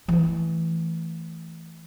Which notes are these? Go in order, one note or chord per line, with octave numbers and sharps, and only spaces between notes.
E3 A3